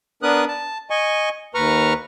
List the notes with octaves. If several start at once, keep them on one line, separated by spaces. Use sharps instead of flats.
B3 D4 A#4 B4 D#6 F#6
A5
D#5 G#5 C#6
D#2 B4 A#5 C#6 F6